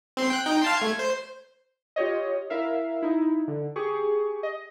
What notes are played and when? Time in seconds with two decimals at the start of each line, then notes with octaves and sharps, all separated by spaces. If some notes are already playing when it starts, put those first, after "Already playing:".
0.17 C4 C6
0.30 G5 F#6
0.45 D#4 G5
0.62 F5 A5 C6
0.77 A3 G#6
0.99 C5
1.96 F4 G4 C#5 D#5
2.50 E4 A#4 E5 F5
3.02 D#4 E4
3.48 D3
3.76 G4 G#4 C#6
4.43 D#5